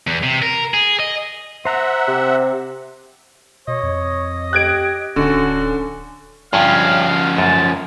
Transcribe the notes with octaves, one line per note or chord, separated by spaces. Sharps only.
E2
C3
A#4
G#4
D#5
C5 E5 F#5 A#5
C3
B2 C#5 D#5
F2
G4 F#6 G#6 D7
D1 D3 C#4 F#4
G2 F3 C#4 F5
F#2 A5